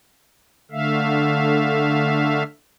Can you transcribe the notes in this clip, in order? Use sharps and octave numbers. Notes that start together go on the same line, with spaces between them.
D3 A3 E5 F5